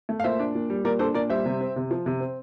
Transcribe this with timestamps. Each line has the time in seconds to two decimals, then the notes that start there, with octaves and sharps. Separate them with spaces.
0.09 A3
0.20 F5
0.24 A#2 C5 E5
0.39 D4
0.55 A#2
0.70 G3
0.84 A#2 A#4 D5
0.99 D4 A4 C5
1.14 A#2 A#4 D5
1.30 G3 C5 E5
1.45 C3
1.61 C4
1.76 C3
1.91 F3
2.06 C3
2.20 C4